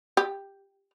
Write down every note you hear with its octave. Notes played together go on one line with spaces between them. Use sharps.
G4